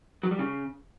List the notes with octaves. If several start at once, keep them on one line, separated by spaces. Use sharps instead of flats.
F#3
G3
C#3